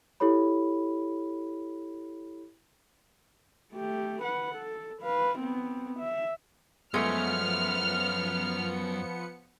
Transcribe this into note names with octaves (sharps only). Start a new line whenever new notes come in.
E4 G4 A4 C#5 B5
A3 G4
B4 F#5
A4
B4 F5
B3 C4
E5
F#2 F3 G#3 A3 B3 F6 C#7